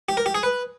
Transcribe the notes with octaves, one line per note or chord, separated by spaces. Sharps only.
G4
A#4
G4
G#4
B4